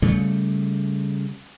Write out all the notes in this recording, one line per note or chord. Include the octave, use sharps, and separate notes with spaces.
C#3 G3 A3